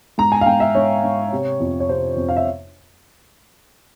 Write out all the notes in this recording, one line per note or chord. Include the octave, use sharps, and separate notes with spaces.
G#2 A#5
G#5
F5
G#2 G5
E5
G#2 C#5
G#2
C3
F2
C#5
C3 C5
F2
F5
E5